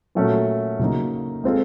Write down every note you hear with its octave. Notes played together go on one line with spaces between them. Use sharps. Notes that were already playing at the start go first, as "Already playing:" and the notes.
A#2 F#3 A3 C#4
C#3 F#3 A#3 D#4
G#3 C4 F4 A4